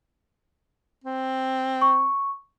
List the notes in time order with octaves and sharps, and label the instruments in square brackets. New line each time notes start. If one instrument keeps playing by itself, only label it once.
[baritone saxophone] C4
[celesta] C#6